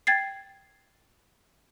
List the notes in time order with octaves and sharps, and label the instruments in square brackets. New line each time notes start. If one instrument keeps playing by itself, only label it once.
[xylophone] G5 G#6 A6 C7